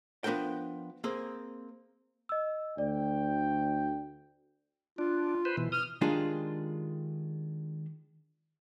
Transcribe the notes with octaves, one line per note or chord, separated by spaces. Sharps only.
F3 B3 D4 A#4 G5
A#3 C4 G#4
D#5 E6
D2 D5 G5
D4 F4
B4 C5
B2 E3
D#6 F6
D#3 G#3 D4 F4 G4 G#4